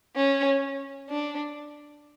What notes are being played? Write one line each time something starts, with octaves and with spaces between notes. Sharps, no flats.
C#4
D4